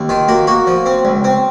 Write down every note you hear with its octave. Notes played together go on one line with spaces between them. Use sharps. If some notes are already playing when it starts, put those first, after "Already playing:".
Already playing: D#2
D#3 F4
A#3 F#4
A#3 F#4
F3
C4
C#2
C4